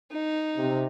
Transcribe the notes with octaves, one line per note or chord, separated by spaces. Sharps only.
D#4
C3